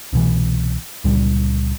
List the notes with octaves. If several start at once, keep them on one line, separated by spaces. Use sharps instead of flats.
C2 B2 E3
C#2 A#2 G3